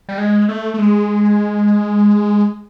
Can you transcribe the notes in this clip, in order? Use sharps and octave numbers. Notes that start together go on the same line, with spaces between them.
G3
G#3
A3
A3
G#3